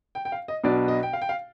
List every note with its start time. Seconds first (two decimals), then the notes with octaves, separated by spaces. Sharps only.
0.15 G5
0.25 G5
0.32 F5
0.48 D#5
0.63 B1 B2 B3 D4 D5
0.88 D#5
1.03 G5
1.13 F5
1.22 G5
1.29 F5